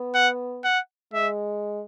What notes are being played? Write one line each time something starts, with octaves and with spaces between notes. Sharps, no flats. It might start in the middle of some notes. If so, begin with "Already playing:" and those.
Already playing: B3
F#5
F#5
G#3 E5